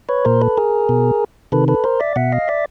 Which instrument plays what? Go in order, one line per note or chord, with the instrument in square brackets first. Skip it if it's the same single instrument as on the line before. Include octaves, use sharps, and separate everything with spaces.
[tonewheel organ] B4 C#5
A#2 A#4 C5
A4 B4
G#4 A#4
B2
C3 D#3 A4 B4
A4 B4
A#4 C5
D5 E5
B2 E5 F#5
D#5 F5
D5 E5